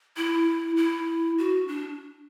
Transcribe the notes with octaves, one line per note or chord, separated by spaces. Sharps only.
E4
E4
F#4
D4